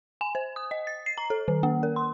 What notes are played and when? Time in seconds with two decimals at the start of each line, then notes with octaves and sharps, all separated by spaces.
0.21 G#5
0.35 C5
0.56 D#6
0.71 D#5
0.87 A6
1.06 C7
1.18 A#5
1.30 A4
1.48 D#3
1.63 A#3
1.83 A#4
1.96 C6